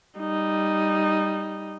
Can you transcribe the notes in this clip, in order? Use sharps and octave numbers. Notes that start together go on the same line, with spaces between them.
G3 D#4